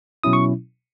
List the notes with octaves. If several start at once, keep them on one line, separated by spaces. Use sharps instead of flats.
B2 F#3 C#4 E4 D#6
C#6